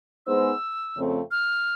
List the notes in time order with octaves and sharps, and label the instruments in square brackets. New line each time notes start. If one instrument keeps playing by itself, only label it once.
[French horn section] G#3 B3 D#4 G#4 C5 [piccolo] E6
[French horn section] F2 C#3 F3 A3 C4
[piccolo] F6